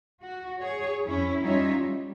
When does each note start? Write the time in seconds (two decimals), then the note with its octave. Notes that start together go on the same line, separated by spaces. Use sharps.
0.22 F#4
0.60 G#4 C#5
1.06 F2 C#4 E4
1.42 G3 C#4 D#4 F4 C#5 E5
1.77 G3